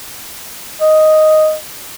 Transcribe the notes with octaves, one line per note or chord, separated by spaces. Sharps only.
D#5